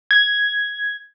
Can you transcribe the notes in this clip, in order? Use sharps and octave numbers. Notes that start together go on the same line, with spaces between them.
G#6